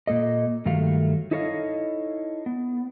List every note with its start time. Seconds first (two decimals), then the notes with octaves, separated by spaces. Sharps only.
0.07 A#2 A#3 A4 D#5
0.66 G2 D#3 F#3 A3 F5
1.31 D#4 E4 A4 C#5 D#5 F5
2.46 B3